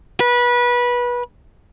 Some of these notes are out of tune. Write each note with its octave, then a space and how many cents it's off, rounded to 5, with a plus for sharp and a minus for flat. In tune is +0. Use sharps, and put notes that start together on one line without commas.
B4 -25